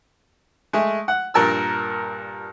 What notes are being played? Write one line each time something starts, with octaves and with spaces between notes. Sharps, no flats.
G#3 A3
F#5
G2 A#2 A#4 A5 E6